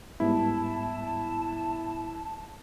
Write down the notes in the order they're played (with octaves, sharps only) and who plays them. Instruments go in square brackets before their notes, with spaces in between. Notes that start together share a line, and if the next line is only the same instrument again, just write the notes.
[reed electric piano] G#2 G3 B3 [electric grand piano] E4 [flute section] A5